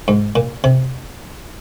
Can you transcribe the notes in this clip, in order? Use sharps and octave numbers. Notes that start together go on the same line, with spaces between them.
G#2
A#2
C3